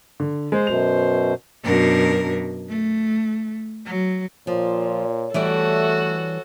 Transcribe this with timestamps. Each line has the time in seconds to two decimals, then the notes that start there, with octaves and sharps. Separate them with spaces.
0.20 D3
0.52 G#3 C5
0.67 F#2 B2 F7
1.63 F#2 B2 D4 A#4
2.68 A3
3.87 F#3
4.47 A#2 F3 C#5
5.34 E3 G3 A3 F#4 A4 D5